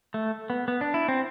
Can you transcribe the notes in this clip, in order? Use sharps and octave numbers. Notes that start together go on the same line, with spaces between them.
A3
B3
B3
D4
E4
C4